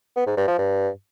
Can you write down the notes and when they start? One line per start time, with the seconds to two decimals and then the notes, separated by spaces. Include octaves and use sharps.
0.16 B3
0.27 G#2
0.37 G2
0.48 F3
0.58 G2